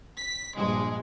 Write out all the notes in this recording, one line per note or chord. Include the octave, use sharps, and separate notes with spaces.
B6
A#1 G2 G#3